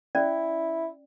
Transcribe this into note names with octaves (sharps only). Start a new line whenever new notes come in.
C#4 E4 D5